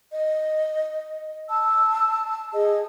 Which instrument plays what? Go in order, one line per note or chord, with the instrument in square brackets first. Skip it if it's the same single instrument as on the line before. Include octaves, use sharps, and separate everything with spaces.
[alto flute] D#5
[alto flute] A5 [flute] E6
[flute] G#4 [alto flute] D#5